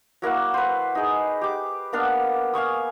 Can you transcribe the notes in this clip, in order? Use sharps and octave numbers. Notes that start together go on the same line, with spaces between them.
F#3 A#3 E4 F#5
B4 C5
D#4 G#4
G4 D6
A#3 B3 D4 F5
F5 G#5 C#6 D#6